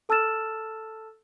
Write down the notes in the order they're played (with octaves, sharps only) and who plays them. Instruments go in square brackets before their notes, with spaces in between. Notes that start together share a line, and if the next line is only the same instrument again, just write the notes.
[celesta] A4 A5 E6 F6 A6 E7